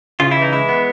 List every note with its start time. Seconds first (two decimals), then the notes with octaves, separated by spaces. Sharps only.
0.20 C#3 F4
0.31 E4
0.36 E3
0.42 D#4
0.52 G#3 E4
0.69 B3